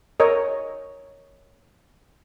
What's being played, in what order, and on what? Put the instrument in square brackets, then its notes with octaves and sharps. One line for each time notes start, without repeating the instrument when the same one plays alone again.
[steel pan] A#4 C#5 D#5